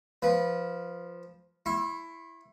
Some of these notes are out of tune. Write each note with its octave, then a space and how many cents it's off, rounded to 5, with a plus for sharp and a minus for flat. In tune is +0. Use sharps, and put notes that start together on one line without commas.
F3 +0 B4 -10
E4 +10 C#6 -45